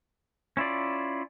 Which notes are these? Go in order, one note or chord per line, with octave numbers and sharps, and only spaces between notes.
C#4 E4 F4 D5